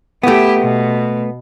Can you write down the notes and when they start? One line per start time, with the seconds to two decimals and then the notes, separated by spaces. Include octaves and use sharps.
0.23 A3 B3 E4 G4
0.60 B2